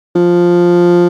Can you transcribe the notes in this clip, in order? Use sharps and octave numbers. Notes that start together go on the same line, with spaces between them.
F3